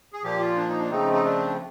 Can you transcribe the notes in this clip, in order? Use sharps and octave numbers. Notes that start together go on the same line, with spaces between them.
G#4
A#2 F3 A#3 G4
F4
D4
D#4
D4
C#3 F3 A3 C4 D#4
D#4
D4